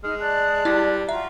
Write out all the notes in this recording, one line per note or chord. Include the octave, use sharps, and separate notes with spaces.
G#3 D#4 F6
D5 A5 F#6
G3 E4
F4 F#4 E5 A#5